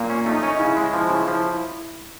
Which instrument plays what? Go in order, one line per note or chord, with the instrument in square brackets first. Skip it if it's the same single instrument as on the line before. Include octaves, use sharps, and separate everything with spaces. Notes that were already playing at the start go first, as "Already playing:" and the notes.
Already playing: [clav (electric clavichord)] A#2 [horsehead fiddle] A#3
[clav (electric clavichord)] C#4
[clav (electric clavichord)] A3 [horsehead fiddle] D#4
[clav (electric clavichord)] C#4
[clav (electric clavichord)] C#3 [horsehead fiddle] E4
[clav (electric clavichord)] G#3
F3
C#3
F3